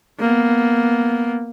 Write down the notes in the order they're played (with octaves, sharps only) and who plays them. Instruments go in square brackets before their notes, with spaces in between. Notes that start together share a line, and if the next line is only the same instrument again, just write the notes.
[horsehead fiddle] A#3 B3